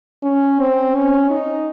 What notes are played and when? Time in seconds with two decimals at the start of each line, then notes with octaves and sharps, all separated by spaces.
0.23 C#4
0.59 C4
0.94 C#4
1.30 D#4